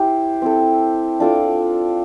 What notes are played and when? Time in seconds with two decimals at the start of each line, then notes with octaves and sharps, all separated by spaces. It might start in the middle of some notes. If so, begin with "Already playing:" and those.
Already playing: E4 G4 C5
0.42 C4 E4 A4
1.20 D4 F4 A4 D5